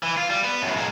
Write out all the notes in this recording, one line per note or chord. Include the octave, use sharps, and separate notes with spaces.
E3
F4
G3
B3
F#2 A2
A#2 G#3